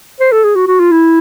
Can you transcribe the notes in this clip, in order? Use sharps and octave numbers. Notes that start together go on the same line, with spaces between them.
C5
A4
G#4
F#4
F#4
F4
E4